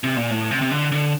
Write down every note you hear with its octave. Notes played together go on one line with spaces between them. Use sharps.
C3
A#2
A2
C3
C3
D3
D3